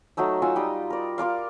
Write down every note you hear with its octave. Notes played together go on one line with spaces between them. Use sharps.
F#3 A3 D#4 E6
F4 F#5 G#5 E6
G3 D#4 D#6
A#4 D5
F4 A#4 D5 F5